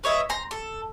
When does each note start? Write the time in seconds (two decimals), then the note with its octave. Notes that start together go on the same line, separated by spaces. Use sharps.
0.04 B4 C#5 D#5 E5
0.29 C5 A#5 C6
0.51 A4